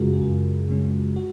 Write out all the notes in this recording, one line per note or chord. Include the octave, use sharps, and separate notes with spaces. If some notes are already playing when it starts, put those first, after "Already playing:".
Already playing: F#2 C#3 G#3 C#4 F4 F#4 G#4 A#4
F#4
F#2 F4
C#3 G#3 C#4
F#4